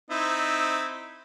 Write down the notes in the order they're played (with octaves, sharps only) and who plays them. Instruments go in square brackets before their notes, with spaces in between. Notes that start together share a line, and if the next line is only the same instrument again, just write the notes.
[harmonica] C4 D#4 E4